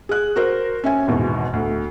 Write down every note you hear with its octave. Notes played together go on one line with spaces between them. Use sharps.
G#4 F#6
F#4 A#4 C5
C#4 E5 G#5
G#1 E2 B2
D2